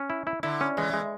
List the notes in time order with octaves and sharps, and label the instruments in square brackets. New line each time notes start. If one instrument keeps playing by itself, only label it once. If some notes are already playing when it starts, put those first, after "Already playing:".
Already playing: [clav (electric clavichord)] C#4
E4
E4
[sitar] D3 [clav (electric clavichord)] E4
[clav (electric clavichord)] C#4
[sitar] E3 [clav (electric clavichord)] G#3
[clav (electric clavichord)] G#3